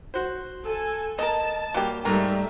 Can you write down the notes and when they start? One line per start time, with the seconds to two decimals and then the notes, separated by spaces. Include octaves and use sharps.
0.14 F#4 C5
0.64 A4 G#5
1.19 A#4 D#5 A5
1.74 F#3 G3 A#3 G4
2.05 G#2 G3 A3 A#4